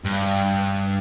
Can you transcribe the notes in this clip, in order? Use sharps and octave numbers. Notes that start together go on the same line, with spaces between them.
G2